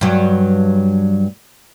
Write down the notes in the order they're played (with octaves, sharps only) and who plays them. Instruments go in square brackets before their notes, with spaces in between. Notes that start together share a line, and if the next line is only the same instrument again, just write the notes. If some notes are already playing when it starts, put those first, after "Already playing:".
[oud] G2 F#3